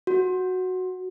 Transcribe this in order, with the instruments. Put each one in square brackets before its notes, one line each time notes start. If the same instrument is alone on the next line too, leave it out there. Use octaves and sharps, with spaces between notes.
[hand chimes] F#4